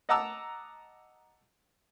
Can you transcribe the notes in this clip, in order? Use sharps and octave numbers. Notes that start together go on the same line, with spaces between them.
D#5 F#5 A5 A#5 D6 E6